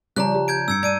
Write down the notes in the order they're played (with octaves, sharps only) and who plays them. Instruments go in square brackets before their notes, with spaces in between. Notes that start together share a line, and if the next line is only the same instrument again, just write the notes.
[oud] C#3 F3 D5 [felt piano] G3 [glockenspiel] A#5 F#6
[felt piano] G4
[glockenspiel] G6 G#6 D7
[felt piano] G2 [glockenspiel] E6 G#6 C#7
[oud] D4 [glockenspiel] G#6 D7 D#7